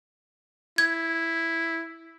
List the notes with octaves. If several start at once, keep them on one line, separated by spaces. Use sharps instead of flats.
E4 G#6